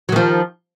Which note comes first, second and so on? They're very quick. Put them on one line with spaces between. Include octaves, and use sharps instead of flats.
F#3 D#3 F3